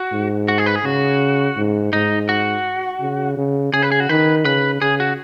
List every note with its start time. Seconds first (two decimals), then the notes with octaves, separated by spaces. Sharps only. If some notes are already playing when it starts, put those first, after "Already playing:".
Already playing: F#4
0.12 G#2
0.48 F#4
0.58 G#4
0.66 B4
0.75 G#4
0.84 C#3 F#4
1.57 G#2
1.93 G#2 D#4
2.29 F#4
3.01 C#3
3.37 C#3
3.73 C#3 G#4
3.82 B4
3.92 G#4
4.00 F#4
4.09 D#3 B4
4.45 C#3 B4
4.81 C#3 G#4
5.00 F#4